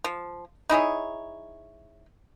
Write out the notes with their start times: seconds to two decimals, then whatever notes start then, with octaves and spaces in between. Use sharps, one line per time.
0.04 F3
0.69 D#4 E4 G#4 C#5